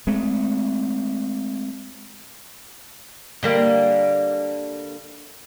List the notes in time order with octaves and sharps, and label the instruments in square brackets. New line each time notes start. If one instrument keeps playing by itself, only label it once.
[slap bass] G#3 A3 C4
[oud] D3 G3 A#3